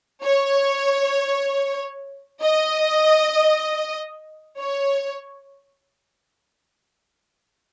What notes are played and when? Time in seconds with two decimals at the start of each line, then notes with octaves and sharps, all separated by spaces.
0.25 C#5
2.42 D#5
4.59 C#5